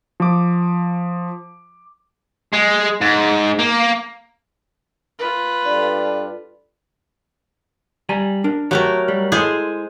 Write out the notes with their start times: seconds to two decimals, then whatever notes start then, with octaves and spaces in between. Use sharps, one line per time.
0.20 F3 D6
2.53 G#3
3.01 G#2
3.59 A#3
5.19 F4 B4
5.66 G2 A4 D5
8.09 G3 G#5 A#5
8.44 D4 A#4
8.71 F#3 A3 F#4 G4 A#4 C#5
9.08 G3
9.32 G#3 E4 G#4 A4 C5